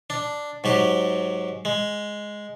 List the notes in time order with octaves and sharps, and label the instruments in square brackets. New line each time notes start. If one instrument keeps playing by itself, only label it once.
[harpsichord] D4
G#2 F#3 G4
G#3